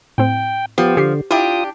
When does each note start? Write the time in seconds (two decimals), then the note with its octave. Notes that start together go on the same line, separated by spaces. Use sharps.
0.18 A2 C4 G5
0.78 F3 B3 G4
0.97 D3 G4 C7
1.31 D4 E4 F4 G4 D#6